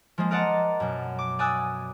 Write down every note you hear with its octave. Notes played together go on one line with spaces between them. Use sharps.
F3 G#3 A#3
A#4 D5 D#5 F#5 A5 A#5
F#2 B2
D6
D5 G#5 D#6 E6 F#6